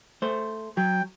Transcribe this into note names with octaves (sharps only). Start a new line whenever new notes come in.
A3 C5
F#3 G5